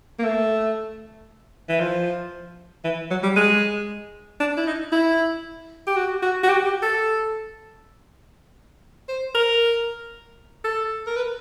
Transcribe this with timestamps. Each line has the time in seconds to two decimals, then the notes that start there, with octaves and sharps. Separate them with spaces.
0.19 A#3
0.25 A3
1.69 E3
1.80 F3
2.84 E3
3.11 F#3
3.23 G3
3.36 G#3
4.40 D4
4.57 E4
4.67 D#4
4.92 E4
5.87 G4
5.96 F#4
6.22 F#4
6.43 F#4
6.49 G4
6.66 G4
6.83 A4
9.09 C5
9.35 A#4
10.65 A4
11.07 A#4
11.16 B4